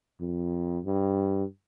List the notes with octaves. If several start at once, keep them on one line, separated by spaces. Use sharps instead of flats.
F2
G2